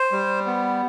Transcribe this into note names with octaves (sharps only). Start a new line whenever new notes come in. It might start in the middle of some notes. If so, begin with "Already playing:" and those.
Already playing: C5
G3
B3